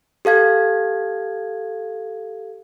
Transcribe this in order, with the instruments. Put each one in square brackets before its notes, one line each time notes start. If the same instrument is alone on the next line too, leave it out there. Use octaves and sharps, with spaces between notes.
[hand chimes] G4 A4 F5 G#6